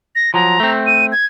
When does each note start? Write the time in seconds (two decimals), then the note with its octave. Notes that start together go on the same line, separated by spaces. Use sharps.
0.15 A#6
0.34 F3 F#3 A#5
0.60 A3 C4
0.87 D#7
1.12 G#6